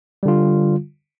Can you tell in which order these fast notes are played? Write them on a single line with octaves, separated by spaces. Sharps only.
G3 D3 F4